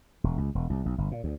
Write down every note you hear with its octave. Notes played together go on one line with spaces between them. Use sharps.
E1
C#2
E1
C2
B1
G1
A#2
D2